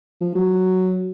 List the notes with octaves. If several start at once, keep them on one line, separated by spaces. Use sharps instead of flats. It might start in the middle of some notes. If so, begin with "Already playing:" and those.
F3
F#3